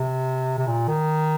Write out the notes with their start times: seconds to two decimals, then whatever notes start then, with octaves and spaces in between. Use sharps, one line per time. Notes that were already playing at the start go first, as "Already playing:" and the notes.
Already playing: C3
0.58 C3
0.67 A#2
0.88 D#3